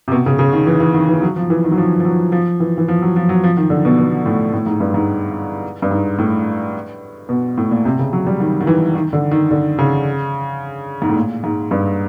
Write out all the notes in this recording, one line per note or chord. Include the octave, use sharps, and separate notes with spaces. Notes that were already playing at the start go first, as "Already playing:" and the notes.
C3
B2
C#3
C#3
D#3
E3
E3
D#3
E3
F#3
F3
E3
D#3
F#3
F3
F3
F#3
F3
E3
E3
F3
F#3
F3
F#3
F3
D#3
D3
B2
B2
A2
A2
G#2
G2
G#2
G2
G#2
A2
B2
A2
A#2
C3
C#3
F#3
G3
D#3
D#3
E3
D#3
D3
D#3
D3
C#3
G#2
A2
A#2
G#2
G2